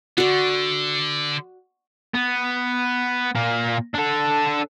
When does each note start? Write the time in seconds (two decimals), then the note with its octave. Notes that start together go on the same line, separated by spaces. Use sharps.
0.18 D3 F#4 D5
2.15 B3
3.35 A#2 A#3
3.95 D4 A4